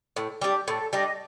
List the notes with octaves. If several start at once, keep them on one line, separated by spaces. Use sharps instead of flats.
A2
G3 D4 G4
A2 A4
G3 D4 D#5